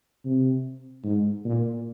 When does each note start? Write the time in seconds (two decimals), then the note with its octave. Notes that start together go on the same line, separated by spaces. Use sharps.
0.25 C3
1.04 G#2
1.45 A#2